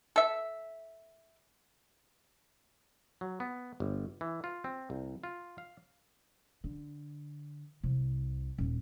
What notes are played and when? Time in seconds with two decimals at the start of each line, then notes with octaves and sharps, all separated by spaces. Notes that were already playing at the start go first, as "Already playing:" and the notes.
0.16 A4 E5
3.21 F#3
3.40 B3
3.80 G1
4.21 E3
4.44 F4
4.64 C4
4.90 C2
5.24 F4
5.58 F5
6.64 D3
7.83 C2 C3
8.58 D#1